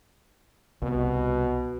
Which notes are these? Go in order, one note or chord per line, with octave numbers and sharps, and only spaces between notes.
C2 B2